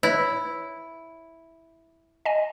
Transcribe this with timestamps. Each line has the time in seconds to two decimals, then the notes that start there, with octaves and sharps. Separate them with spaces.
0.03 E4 B4 C#5
2.25 D#5 G#5